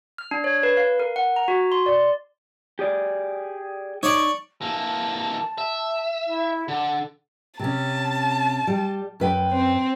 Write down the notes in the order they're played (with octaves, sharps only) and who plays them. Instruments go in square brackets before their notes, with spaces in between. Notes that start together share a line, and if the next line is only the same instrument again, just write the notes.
[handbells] F6
D4
C#5
B4
F5
A#4
F#5
A#5
F#4
C6
D5
[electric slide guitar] G4 G#4 D5
[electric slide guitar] D#4 [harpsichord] C#5 D5
[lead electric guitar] E3 A#3 [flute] A5
[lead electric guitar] E5
[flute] E4
[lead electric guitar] D3 [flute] A4
[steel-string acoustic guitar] C3 C#4 [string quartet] A5
[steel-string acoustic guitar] G3
F#2 B4 G5
[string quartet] C4